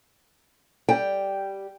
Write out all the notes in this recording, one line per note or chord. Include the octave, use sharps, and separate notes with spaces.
G3 G5